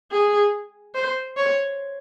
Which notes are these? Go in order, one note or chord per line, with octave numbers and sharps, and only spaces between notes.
G#4
C5
C#5